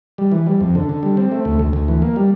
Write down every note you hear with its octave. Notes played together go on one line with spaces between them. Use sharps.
G3
E3
G3
F2
D3
D3
G3
C4
A3
D2
D2
D2
E3
A#3
G3